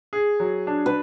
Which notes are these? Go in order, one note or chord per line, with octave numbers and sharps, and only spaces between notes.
G#4
F#3
D4
B4